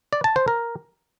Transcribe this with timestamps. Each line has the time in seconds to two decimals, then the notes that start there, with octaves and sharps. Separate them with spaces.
0.13 D5
0.24 A5
0.36 C5
0.48 A#4